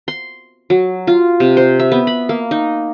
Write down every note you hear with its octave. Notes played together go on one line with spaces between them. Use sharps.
C6
F#3
F4
C3
C5
E5
B3
B5
A#3
D#4